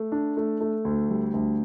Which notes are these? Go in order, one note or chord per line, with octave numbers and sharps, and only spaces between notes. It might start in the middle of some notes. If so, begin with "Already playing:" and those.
Already playing: A3
D4
A3
A3
D2
G3
D2